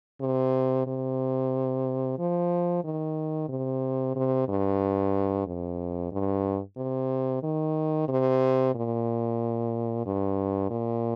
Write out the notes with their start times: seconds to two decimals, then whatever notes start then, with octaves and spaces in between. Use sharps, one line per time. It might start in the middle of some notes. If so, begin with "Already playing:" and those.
0.21 C3
0.87 C3
2.19 F3
2.84 D#3
3.49 C3
4.16 C3
4.48 G2
5.46 F2
6.12 G2
6.77 C3
7.43 D#3
8.08 C3
8.75 A#2
10.06 G2
10.70 A#2